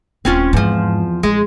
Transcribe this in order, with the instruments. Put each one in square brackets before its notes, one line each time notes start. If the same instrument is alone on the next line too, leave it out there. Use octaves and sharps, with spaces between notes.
[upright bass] D#1 [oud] C4 C#4 F4
[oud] E2 F3 [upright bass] G#2
[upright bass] A1 [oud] G#3